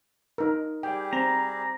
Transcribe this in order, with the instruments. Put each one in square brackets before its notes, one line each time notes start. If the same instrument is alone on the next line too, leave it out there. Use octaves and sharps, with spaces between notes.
[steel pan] D#4 A#4
[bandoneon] G3 G4 G#4 [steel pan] G5
[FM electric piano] C4 [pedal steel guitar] A#5